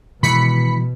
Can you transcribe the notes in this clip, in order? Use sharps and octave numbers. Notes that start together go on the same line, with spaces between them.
B2 D#3 E3 G#3 B5 B6 C#7